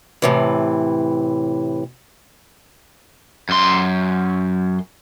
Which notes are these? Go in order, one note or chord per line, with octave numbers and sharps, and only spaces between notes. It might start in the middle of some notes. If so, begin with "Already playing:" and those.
A2 C3 E3
F#2 C6